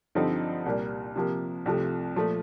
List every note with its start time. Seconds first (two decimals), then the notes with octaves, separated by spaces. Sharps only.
0.15 G2 D3 F3 C4 D#4
0.66 C2 A#2 G3 A#3
1.16 C3 F3 A#3
1.66 C2 C3 F3 A3
2.16 A#2 F3 A3